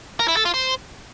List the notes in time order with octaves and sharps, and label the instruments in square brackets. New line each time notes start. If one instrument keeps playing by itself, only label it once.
[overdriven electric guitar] A#4
E4
A4
F4
C5